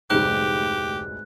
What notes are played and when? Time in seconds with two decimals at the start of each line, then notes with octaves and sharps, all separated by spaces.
0.10 F1 D2 G#2 G3 G4 F#6